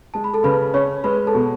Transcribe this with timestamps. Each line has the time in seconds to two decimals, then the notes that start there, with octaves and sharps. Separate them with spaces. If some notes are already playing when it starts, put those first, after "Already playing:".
0.14 G#3 A5
0.24 B5
0.34 A4 A5
0.44 C#3 B4 B5
0.74 C#4 C#5 C#6
1.04 G#3 B4 B5
1.27 A4 A5
1.34 B2